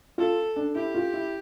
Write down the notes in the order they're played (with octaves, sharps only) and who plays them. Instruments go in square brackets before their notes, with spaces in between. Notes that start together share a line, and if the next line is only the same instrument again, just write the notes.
[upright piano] F4 [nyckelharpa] A4
[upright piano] D4
[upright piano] E4 [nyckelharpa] G4
[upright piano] F4
E4